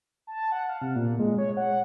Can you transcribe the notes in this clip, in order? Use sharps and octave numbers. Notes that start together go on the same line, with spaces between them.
A5
F#5
F5
C3
A#2
G#3
C#5
F#5